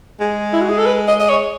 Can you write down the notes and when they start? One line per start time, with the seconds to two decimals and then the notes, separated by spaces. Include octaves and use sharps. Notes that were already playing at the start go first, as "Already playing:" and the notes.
0.20 G#3
0.53 E4
0.61 F#4
0.69 G#4
0.78 A4
0.86 B4
1.08 D#5
1.20 D#5
1.29 C#5